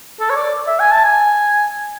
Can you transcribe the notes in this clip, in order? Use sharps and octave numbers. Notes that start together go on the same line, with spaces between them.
A4
C#5
D5
E5
G#5
A5
G#5